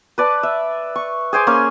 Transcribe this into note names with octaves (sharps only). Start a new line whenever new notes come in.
B4 D5 A5
E5
C#6
G#4 C5 G#5 D6
A#3 C#4 F5 C6